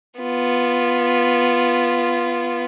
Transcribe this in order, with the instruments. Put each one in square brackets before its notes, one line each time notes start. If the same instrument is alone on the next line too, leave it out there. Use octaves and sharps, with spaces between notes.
[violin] B3 F4